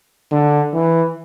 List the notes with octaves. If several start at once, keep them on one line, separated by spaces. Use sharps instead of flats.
D3
E3